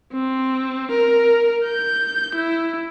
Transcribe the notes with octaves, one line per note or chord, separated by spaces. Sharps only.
C4
A#4
G6
E4